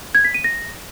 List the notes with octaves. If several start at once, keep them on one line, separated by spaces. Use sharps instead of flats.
G#6
B6
D#7
A#6